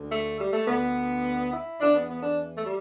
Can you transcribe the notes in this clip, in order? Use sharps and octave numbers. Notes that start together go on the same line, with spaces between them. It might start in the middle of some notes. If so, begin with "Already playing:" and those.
Already playing: D2 D3
A3
G3
A3
D2 D3 B3
E4
E2 E3 D4
B3
B3
D4
A3
G3